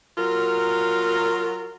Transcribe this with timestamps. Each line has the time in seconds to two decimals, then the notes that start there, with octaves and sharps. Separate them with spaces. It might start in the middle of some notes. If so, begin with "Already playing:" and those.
0.18 F#3 F4 A#4